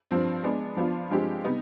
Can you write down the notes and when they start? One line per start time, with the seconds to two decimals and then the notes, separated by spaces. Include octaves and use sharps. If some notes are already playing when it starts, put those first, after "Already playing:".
0.11 G2 F3 C4
0.44 G#3 B3 D4
0.77 F3 B3 D4 F4
1.11 G2 F3 G#3 C4 G4
1.44 C3 G3 B3 D#4